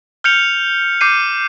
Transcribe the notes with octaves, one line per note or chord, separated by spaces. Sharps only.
F6 G6 C#7 F7
D6 G6 C7 D#7